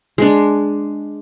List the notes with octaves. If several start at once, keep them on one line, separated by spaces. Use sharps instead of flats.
G#3 D4